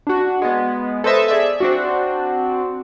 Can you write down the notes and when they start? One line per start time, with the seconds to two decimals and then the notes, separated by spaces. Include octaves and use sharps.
0.07 D4 F#4
0.42 G#3 B3
1.04 A4 B4 C5 D#5 E5 A5
1.28 G#4 D5 E5
1.60 C4 D4 F#4